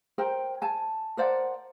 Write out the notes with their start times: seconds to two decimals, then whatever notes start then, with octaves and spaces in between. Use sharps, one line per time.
0.18 A#4 C5 G5
0.62 G#5 A5
1.17 A#4 C5 D5 F#5